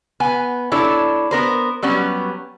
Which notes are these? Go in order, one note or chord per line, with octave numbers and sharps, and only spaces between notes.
B3 G#5
D4 E4 A4 C#5
B3 A#4 C5
F#3 G3 B3 C#4